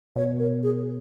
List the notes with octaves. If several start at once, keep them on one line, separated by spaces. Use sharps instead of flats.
B2 C#5
A#4
G#4